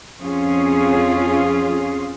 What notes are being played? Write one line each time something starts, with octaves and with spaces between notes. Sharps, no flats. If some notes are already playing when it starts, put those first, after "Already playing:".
F2 C#4 F4 G#4